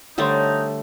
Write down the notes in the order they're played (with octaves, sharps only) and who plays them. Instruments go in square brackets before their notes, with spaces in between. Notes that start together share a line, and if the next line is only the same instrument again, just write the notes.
[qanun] D3 G3 A3 [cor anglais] D#4 [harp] C5 C#5 E5